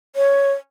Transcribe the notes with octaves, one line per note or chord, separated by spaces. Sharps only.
C#5